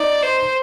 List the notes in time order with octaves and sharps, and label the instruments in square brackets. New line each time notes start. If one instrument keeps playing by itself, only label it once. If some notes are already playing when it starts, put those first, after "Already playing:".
Already playing: [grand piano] D#4 [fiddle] D5
[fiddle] C5